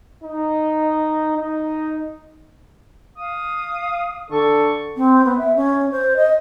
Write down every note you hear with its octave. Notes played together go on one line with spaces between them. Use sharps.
D#4
D#4
F5 D#6
D3 A4 C#6
C4
B3
E5
C#4
C5
D#5